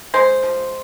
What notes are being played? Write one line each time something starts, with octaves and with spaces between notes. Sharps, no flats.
G#3 C5
F3